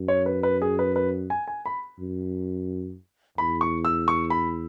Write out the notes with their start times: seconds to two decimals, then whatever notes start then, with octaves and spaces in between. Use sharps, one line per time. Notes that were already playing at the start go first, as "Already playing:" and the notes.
Already playing: F#2
0.08 C#5
0.26 B4
0.43 B4
0.62 G#4
0.79 B4
0.96 B4
1.30 G#5
1.48 G#5
1.66 B5
1.99 F#2
3.38 E2 B5
3.61 C#6
3.85 E6
4.08 C#6
4.30 B5